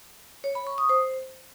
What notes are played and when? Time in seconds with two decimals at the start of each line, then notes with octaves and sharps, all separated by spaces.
0.44 C#5
0.55 B5
0.67 C#6
0.78 D#6
0.89 C5